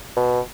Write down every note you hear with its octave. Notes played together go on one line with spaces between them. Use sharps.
B2